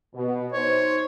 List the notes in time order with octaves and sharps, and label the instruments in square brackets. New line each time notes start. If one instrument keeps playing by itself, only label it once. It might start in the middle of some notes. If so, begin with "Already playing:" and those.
[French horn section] B2
[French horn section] D#4 C5 [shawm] C#5